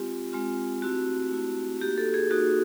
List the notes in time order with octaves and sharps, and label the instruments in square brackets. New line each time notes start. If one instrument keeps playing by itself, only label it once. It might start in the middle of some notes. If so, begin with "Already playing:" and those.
Already playing: [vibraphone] G#3 C4 F4 G4
G#3 C4 F4
A3 C4 E4 F#4
A3 C4 E4
A#3 D#4 F#4 G4
A4
G#4
A#3 D#4 F#4